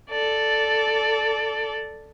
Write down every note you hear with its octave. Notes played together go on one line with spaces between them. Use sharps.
A4 D5